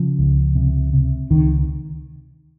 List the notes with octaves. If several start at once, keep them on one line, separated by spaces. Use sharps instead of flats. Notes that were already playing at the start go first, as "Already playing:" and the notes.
Already playing: C#3 F3
C#2
C3
C3
C#2 D#3